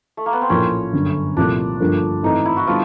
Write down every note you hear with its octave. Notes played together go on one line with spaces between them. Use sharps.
A3
A#3
B3
C4
A#1 A2 F3 A#3 C#4
G1 F#2 D3
C2 A#2 F3 A3 D4
G1 G2 D3 F3 A#3
G#2 E3 A3 C4 D#4
E4
F#4
D3 F3 G3 B3 F4